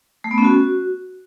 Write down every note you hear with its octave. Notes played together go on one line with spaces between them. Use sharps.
A3
B3
C#4
F#4